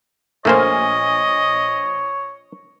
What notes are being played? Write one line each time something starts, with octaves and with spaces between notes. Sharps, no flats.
A#1 A3 A#3 C5 C#5 D#5 G#5 F6